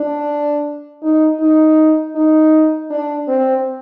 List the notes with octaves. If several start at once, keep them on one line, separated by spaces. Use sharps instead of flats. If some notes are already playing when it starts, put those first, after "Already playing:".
Already playing: D4
D#4
D#4
D#4
D4
C4